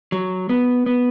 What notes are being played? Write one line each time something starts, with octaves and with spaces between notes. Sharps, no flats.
F#3
B3
B3